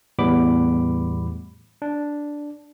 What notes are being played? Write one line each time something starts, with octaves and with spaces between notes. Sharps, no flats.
E2 A2 G3 B3 B5 D6
D4